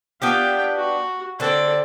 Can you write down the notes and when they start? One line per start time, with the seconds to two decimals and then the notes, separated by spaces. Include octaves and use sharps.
0.22 B3 D4 F4 G4 G5
0.76 F#4
1.40 D3 C4 A4 D5